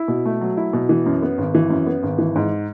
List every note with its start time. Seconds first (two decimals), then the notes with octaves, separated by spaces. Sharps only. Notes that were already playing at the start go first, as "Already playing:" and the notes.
Already playing: E4
0.08 B2
0.25 A3
0.41 F#3
0.57 E4
0.73 B2
0.89 E3
1.06 F#2
1.22 B3
1.38 G#1
1.55 E3
1.70 F#2
1.86 B3
2.03 G#1
2.18 E3
2.36 G#2